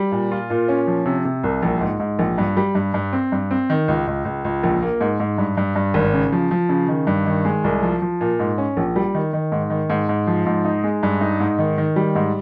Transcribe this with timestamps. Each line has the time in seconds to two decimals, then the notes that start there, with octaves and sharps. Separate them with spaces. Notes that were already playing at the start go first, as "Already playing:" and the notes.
Already playing: G3
0.12 A#2
0.31 F4
0.50 A#2
0.68 C#4
0.87 F3
1.06 C3
1.25 C3
1.44 C2
1.63 A#1
1.81 G#2
2.00 G#2
2.19 A#1
2.38 G2
2.57 G3
2.75 G2
2.94 G2
3.13 C4
3.32 G2
3.51 C4
3.70 D#3
3.88 C#2
4.07 C#2
4.25 C#2
4.44 C#2
4.63 A#1
4.83 A#3
5.01 G#2
5.20 G#2
5.38 G2
5.57 G2
5.76 G2
5.94 G#1
6.14 C#3
6.32 F3
6.51 F3
6.69 C#3
6.88 D#3
7.07 G2
7.26 D#3
7.45 G#3
7.64 C2
7.83 F3
8.02 F3
8.21 A#2
8.40 G#2
8.58 C#4
8.77 A#1
8.96 G3
9.15 D#3
9.33 D#3
9.52 G#2
9.70 D#3
9.90 G#2
10.09 G#2
10.27 F3
10.46 G#2
10.65 D#4
10.84 G#3
11.03 G2
11.21 D#4
11.40 G#2
11.58 D#3
11.78 D#3
11.96 G3
12.15 G#2